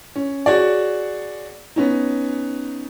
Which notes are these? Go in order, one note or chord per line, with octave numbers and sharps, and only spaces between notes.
C#4
F#4 G#4 C#5 D5
B3 C#4 D#4